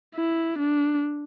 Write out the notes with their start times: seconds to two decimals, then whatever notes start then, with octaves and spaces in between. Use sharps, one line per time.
0.15 E4
0.58 D4